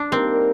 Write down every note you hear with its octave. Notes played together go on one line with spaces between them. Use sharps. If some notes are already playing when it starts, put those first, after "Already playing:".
Already playing: D4
G3 A#3 C4 D#4 G4 A#4